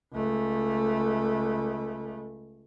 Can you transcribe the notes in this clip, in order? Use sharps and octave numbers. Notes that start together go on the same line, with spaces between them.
C#2 A3